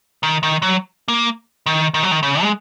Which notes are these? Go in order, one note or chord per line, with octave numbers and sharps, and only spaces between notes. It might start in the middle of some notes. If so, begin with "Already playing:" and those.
D#3
D#3
F#3
A#3
D#3
D#3
F#3
D#3
C#3
G#3